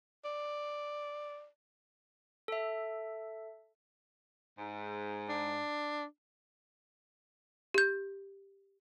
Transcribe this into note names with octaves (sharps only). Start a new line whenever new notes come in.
D5
A4 E5
G#2
D4
G4 G6